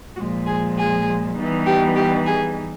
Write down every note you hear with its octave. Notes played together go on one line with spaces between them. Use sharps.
A#2 F3 G#3 F#4
G#4
G#4
E3 G3 B3 D#4
G4
G4
G#4